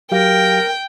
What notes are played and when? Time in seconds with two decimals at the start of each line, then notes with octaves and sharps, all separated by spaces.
0.12 F#3 G4 A#4 F5 G5